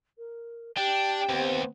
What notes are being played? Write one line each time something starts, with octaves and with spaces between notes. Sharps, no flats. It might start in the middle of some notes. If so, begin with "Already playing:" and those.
A#4
D4 G4 G5
D#2 B3 C4